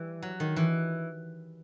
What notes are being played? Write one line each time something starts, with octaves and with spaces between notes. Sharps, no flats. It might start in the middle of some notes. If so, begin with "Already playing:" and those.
Already playing: E3 G3
F#3
D#3
E3